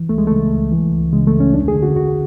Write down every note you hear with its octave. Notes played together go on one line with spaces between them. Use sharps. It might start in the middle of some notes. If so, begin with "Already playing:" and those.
Already playing: E3
C#2 A3
G#3
C#3 A3
C#2
E3
C#2
C#3 G#3
A3
C#2
C#4
E2 D4
G#4
D3
F#4
D3 F#4